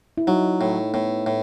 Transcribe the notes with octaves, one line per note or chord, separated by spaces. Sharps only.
E4
F#3 D#4
A2
A2 B3
A2